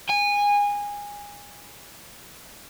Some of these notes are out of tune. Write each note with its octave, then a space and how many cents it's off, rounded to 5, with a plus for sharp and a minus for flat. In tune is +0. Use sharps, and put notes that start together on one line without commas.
G#5 -20